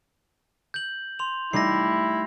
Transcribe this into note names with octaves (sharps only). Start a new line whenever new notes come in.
G6 F#7
C6 F7
G3 A3 D#4 E4 A#6 C7